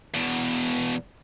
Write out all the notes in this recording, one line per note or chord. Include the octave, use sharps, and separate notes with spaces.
E2 B2